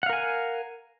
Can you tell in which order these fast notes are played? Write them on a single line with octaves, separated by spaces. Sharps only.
F#5 F5 A#4 G#5